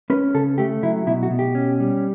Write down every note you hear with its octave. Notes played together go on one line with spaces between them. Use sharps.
C#4 B4
C#3 A4
A3 G4
F#3 E4
B2 E4
F#4
B2
G4
C#4
G3